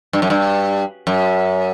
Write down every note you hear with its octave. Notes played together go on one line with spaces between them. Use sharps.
G2
F#2
G2
F#2